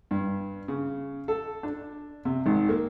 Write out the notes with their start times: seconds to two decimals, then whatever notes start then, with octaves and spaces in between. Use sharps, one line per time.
0.11 G2
0.68 C#3
1.28 A4
1.63 D4
2.25 C3
2.46 G#1
2.69 A#3